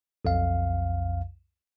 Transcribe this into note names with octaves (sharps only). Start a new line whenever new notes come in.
B1 F2 F5